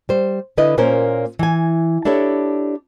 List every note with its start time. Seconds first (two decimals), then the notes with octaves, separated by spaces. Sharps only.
0.09 G3 C5
0.57 D3 E4 B4 D#5
0.78 A#2 A#3 C#4 A#4 C5
1.39 E3 G#5
2.05 D4 E4 G4 A4 C#5